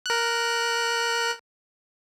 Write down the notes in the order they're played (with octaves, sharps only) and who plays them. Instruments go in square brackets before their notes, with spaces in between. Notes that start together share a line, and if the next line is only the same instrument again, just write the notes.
[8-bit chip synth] A#4 F#6